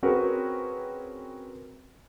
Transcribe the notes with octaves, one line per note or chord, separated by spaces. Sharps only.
C4 C#4 F#4 G#4 A#4 B4